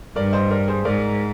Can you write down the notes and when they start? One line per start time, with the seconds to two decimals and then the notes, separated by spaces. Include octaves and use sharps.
0.16 G2 A#4 D5
0.33 C5 D#5
0.51 A#4 D5
0.68 G#4 C5
0.85 G#2 A#4 D5